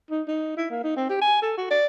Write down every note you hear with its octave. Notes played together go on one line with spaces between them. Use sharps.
D#4
D#4
E4
A#3
D#4
C4
G4
G#5
A4
F#4
D5